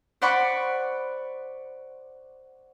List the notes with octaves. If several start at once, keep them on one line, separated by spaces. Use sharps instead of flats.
C5 D5 F#5 B5 C#6 D6